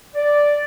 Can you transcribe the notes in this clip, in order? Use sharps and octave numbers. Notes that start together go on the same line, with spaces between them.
D5